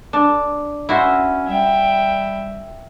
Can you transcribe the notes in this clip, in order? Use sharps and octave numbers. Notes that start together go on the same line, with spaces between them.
D4
C#4 E4 F#4 C5
G3 E5 G5